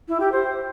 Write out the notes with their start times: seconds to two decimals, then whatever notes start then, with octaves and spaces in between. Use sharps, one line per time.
0.08 E4
0.20 G4
0.32 C5